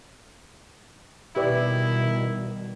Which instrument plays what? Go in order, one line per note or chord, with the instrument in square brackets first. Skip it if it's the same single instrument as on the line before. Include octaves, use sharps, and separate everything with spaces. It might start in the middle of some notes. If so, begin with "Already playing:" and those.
[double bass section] B2 D#3 G3 [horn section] D#4 E4 [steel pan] G4 B4 D5